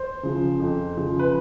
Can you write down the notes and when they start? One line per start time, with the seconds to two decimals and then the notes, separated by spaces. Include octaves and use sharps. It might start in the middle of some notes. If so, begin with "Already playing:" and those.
Already playing: C5
0.23 C#3 F3
0.60 F2
0.97 C#3 F3
1.19 B4